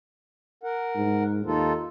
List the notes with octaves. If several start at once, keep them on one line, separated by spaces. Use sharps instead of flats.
A#4 F#5
G#2
D#2 D#4 F4 A4